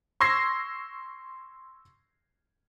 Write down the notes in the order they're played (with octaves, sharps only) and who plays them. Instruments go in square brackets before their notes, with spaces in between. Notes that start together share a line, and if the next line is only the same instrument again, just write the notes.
[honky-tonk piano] C6 C#6 E6 G#6 A#6 C7